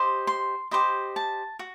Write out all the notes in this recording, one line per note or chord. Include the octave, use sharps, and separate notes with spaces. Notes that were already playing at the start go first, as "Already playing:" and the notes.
Already playing: G4 C5 D#5
C6
G4 C5 D#5 B5
A5
F#4